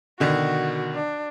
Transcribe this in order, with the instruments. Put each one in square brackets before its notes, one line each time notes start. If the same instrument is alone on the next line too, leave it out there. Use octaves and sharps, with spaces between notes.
[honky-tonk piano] B2 D3 D#3 [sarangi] F#4
[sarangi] D4